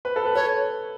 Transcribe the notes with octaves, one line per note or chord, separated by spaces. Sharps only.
B4
A4
B4
A4 C#5